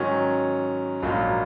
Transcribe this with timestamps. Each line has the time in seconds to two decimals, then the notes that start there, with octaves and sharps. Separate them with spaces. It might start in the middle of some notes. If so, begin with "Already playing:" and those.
Already playing: G#2 D#3 F#3 C#4
1.03 A#1 G#2 F#3 A#3